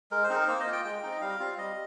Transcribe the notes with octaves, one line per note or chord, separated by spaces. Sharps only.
G#3 A#4
C5
C4 D#4
A#4
A#3 C5
D#5
F4
G5
G#3 G5
C4 D#4
D#5
G3 F5
C4 F4
G3 D#5